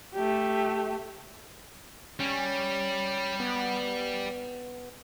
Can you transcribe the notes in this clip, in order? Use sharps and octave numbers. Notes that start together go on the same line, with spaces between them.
A3 G4
G3 C#4
B3